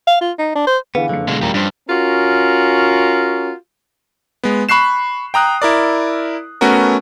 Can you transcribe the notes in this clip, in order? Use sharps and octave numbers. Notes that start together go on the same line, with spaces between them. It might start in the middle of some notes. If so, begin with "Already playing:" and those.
F5
F4
D#4
D4
C5
D3 E3 B3 G#4 B4 F5
F#1 F2 D3 C#7
B2 G#3
D2 A2 F3 G3 C#4 G4 A#4
G2 D4 C5
C#4 F4 F#4 A#4
G#3 B3
B5 C#6 F#6 C7 E7
G5 A#5 D#6 F#6
E4 A#4 D5
A3 B3 C#4 F#4 A#4